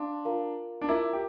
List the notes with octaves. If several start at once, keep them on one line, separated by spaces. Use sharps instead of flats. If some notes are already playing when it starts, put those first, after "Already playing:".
Already playing: D4 C5 F5 C6
F4 A#4 F5 A#5
D4
E4 F4 A#4 E5 A#5 D6
G4